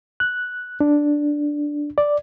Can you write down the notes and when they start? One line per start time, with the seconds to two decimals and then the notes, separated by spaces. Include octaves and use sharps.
0.20 F#6
0.81 D4
1.98 D5